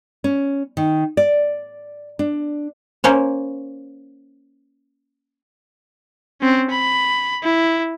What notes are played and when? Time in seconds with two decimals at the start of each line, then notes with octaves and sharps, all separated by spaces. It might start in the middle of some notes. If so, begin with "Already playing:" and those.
0.24 C#4
0.77 D#3
1.17 D5
2.19 D4
3.04 A#3 C#4 C5 C#5
6.41 C4 C#4
6.70 B5
7.44 E4